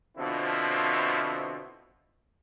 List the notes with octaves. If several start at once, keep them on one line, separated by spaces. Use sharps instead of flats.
B2 D3 F3 C4 E4 F4